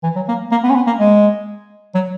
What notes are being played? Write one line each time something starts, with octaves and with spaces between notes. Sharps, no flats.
E3
F#3
A#3
A#3
B3
C#4
B3
A#3
G#3
F#3